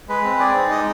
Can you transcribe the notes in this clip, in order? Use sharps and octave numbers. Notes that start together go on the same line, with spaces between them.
G#3 B4
C4
G#4 D5
D#4
G#3 D#5